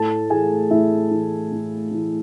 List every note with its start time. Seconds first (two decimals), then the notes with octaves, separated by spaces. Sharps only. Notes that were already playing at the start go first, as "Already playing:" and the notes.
Already playing: A2 A4 A5
0.30 E3 G#4 G#5
0.71 A2 E4 E5
1.11 E3
1.52 A2
1.91 E3